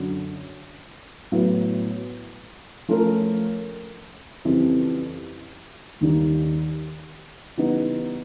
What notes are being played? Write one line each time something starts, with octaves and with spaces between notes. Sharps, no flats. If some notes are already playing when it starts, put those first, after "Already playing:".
Already playing: F#2 D3 F#3
A2 F#3 B3 E4
F3 A3 C#4 F4 A#4
F2 C#3 E3 G3 C4
D#2 D#3 G3 A#3
C#3 E3 G3 B3 D#4